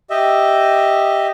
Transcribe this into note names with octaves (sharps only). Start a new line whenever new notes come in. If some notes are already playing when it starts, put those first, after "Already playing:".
G4 D#5 E5